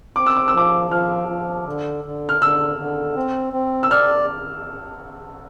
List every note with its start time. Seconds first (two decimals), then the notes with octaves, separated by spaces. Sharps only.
0.16 C4 D6
0.26 E6
0.37 D6
0.48 E6
0.54 F3 D6
0.91 F3 F6
1.29 F3
1.66 D3
2.05 D3
2.29 F6
2.41 D3 E6
2.79 D3
3.16 C4
3.53 C4
3.83 E6
3.91 D5 F6